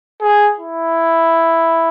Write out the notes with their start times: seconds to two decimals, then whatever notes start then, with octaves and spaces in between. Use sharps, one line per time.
0.22 G#4
0.59 E4